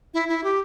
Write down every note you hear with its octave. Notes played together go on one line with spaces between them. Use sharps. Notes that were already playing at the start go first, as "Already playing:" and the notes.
E4
E4
G4